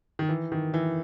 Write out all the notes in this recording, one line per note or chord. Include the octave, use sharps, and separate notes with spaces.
D#3
E3
D#3
E3